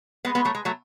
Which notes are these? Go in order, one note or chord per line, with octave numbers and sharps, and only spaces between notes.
G#3 B3
G#3 B3
F#3 A3
G#3
F#3 A3